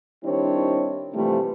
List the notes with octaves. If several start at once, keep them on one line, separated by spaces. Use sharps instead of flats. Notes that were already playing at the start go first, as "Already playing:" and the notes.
D#3 G3 C4 D4 E4 C#5
C3 E3 F3 G3 A3